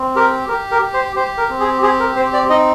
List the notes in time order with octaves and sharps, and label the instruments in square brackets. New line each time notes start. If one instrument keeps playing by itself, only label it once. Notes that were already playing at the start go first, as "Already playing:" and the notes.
Already playing: [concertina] C4
G4 A#4
G4 A#4
A#4
G4
C5
G4 C5
A#4
C4
G#4
G4 G#4
A#4
C4 C5
D5
D#4 D#5